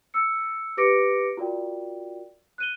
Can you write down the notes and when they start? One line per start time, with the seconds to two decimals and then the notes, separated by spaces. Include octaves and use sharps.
0.14 E6 C#7
0.77 G4 B4 D6 A#6 C#7 D7
1.37 F4 F#4 A#4 D5 G5
2.58 F#6 D#7 G7